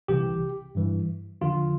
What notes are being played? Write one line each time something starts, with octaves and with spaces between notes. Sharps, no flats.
C2 C3 E3 G4
G2 E3 G3
E2 D3 F3 F4